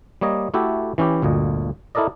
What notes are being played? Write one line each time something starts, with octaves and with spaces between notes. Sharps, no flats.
G3 A#3 C#5 D#5
A3 E4 F#4 G4 A4
E3 C#4 E4 G4
G1 D2 A#2 D#5
E4 A4 A#4 D5 D#5